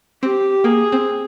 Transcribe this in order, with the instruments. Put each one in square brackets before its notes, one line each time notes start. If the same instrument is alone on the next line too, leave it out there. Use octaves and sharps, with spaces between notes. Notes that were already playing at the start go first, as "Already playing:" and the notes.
[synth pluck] C4 [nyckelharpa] G4
[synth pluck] A#3 [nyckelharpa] G#4
[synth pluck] C4